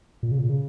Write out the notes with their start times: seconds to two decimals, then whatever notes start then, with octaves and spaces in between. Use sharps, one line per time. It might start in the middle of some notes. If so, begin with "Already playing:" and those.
0.23 A#2
0.32 C#3
0.39 A#2
0.50 C#3